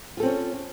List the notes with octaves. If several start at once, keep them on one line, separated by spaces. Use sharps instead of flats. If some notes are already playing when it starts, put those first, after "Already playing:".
C4 C#4 F4 A4